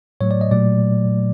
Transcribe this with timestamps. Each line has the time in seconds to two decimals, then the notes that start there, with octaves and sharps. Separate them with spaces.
0.21 A2 F#3 A3 C#5
0.31 D5
0.41 D#5
0.51 A#2 F#3 A3 D5